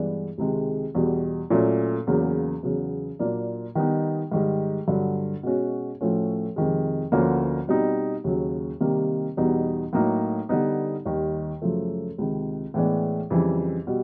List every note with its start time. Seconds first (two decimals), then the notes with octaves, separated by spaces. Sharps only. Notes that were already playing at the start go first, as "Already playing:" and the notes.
Already playing: G2 E3 G#3 B3 D4
0.38 C#2 C3 D#3 G#3
0.95 E2 B2 G3
1.50 A#2 F#3 A3 C#4
2.07 E2 C#3 F#3 A#3
2.63 E2 C#3 F#3 B3
3.19 A#2 F#3 A#3 D4
3.75 D#3 G3 B3 D#4
4.32 G#2 D#3 G3
4.88 G2 D3 F#3
5.43 B2 G#3 C#4 F#4
6.01 A2 F3 A3 C#4 F#4
6.56 F2 C3 D#3 G#3
7.12 D2 D3 F3 A#3 C#4
7.68 B2 G3 C4 D#4
8.24 D#2 C#3 F#3
8.80 C3 D#3 G3 A#3
9.37 E2 B2 G3 B3 D#4
9.93 A2 F#3 A#3 D#4
10.49 D3 G3 B3 D#4
11.05 D#2 D#3 G3
11.62 F#2 C#3 F3 A3
12.18 C#2 C3 D#3
12.74 A2 E3 G#3 B3 D4
13.30 F2 C#3 E3 G3
13.87 B2 G3